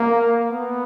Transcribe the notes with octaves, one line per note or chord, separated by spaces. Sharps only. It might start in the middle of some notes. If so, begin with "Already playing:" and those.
Already playing: A#3
B3